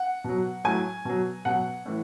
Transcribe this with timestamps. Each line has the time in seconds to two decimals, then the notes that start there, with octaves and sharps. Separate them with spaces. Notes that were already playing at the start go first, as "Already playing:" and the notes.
Already playing: F#5
0.24 B2 F#3
0.64 A2 F#3 G#5
1.05 B2 F#3
1.45 B2 F#3 F#5
1.86 A2 E3